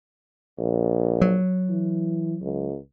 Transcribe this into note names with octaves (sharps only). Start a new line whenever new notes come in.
A#1
F#3
E3
C#2